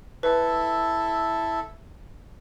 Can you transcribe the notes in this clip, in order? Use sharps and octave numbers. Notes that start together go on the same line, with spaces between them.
E4 A4 B4